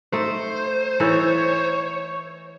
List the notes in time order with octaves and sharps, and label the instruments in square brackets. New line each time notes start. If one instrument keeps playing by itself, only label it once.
[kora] A3 D#4 [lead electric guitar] C5
[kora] E3 D#4 A4 [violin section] C#5